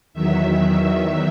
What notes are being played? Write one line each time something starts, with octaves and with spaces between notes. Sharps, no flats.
E2 D#3 F#3 E5
E5